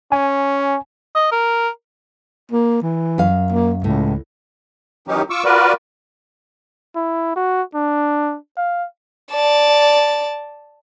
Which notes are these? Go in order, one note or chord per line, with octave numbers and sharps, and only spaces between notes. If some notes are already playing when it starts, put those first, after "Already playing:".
C#4 G#5
D#5
A#4
A#3
E3
F#2 F5
A#3
C#2 A2
D#3 E3 F#3 C#4 D#4 G4
F4 C#6 D6 E6
F4 F#4 A#4 B4 D5
E4
F#4
D4
F5
D5 A5